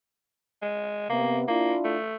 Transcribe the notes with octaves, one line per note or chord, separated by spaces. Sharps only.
G#3
C3 A#3 B3
A#3 D4 E4 F4
A3